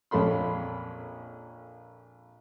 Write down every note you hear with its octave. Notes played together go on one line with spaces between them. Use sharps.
A#1 F2 C#4 A4 B5 C6